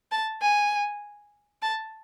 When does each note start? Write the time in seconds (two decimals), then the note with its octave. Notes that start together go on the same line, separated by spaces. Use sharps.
0.12 A5
0.42 G#5
1.62 A5